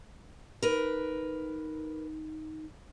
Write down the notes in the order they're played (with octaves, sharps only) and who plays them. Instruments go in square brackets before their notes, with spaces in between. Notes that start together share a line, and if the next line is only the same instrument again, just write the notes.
[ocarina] D#4 [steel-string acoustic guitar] A#4 B4